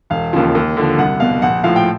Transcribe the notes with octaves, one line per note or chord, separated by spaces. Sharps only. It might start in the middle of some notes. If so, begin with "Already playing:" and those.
E1 F5
D#2 C#3 F3
D#2
D3 F3
C2 F#5
B2 F5
A#1 F#5
A2 F3 F5
G5